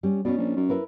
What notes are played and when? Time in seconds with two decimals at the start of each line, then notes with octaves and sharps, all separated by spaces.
0.03 G3 C#4
0.25 B2 C#4 D#4 D5
0.38 A#1
0.57 F#2
0.69 E4 A#4 B4